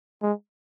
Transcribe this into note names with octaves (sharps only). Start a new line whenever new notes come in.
G#3